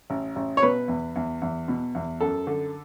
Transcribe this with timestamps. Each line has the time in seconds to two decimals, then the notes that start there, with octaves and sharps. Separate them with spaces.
0.10 A1
0.36 A1
0.57 C#5
0.62 B2 B4
0.88 E2
1.16 E2
1.42 E2
1.68 B2
1.95 E2
2.20 F#2 A4
2.47 D3